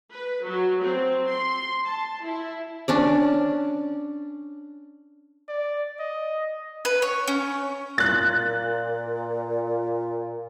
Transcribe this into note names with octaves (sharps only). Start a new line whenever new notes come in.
B4
F#3
C4
C6
A5
E4
C#4 D4 D5
D5
D#5
B4
C#5
C#4
A#2 F#6 A6